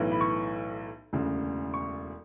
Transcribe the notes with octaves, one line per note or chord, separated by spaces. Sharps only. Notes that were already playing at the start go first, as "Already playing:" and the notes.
Already playing: B1 A2 E3
B5
C#6
E1 D2 C#3
C#6